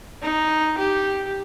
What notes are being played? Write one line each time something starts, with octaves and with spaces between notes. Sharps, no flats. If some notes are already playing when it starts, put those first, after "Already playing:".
D#4
G4